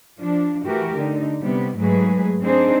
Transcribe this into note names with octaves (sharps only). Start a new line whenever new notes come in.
F3 D4
E3 A3 F#4 G4 A#4
D3 D#4
C3 G3 B3
G#2 F#3 G#3 A3 G#4 B4
C4 D4 D#4 G#4 C5